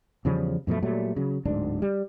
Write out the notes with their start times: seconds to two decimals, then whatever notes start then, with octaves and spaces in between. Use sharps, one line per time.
0.25 E2 C#3 F3 G3
0.67 F#2 B2 F3 A3
0.82 A#2 F#3 G3 A3
1.16 C#3 F#3
1.45 D1 D2 G#2 D4
1.82 G3